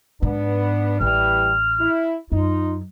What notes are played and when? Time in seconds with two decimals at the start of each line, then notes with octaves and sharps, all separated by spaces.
0.22 G#2 B3 D4
1.01 A1 E3 G3 F6
1.80 E4
2.32 F#2 D#4 F4